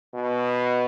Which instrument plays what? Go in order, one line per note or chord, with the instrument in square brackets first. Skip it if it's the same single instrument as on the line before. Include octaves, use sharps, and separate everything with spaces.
[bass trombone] B2